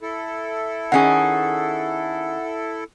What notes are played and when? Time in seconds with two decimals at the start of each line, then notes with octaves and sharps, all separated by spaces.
0.02 E4 A4
0.92 D#3 C#4 G#4 F#5